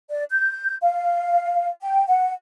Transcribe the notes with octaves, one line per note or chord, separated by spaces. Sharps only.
D5
G6
F5
G5
F#5